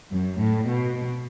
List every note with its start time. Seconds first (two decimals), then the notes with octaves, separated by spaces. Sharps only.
0.13 F#2
0.41 A2
0.69 B2